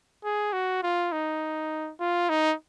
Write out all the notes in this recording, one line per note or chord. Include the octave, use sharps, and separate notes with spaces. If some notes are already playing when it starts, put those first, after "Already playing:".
G#4
F#4
F4
D#4
F4
D#4